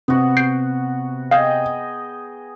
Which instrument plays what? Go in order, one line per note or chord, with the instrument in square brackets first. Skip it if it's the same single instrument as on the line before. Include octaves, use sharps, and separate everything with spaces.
[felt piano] C3 [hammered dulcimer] B3 F#4
[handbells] G6 C7 D7
[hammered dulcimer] G#4 D#5 G5 [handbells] F5